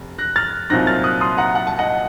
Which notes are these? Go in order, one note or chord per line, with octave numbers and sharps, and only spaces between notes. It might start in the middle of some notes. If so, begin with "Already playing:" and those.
Already playing: F1
F#6 A#6
F6 A6
C2 A#2 F#3 C4 D#4 F#6 A#6
F6 A6
D#6 F#6
C6 D#6
F#5 A#5
F#5
A5
D#5 F#5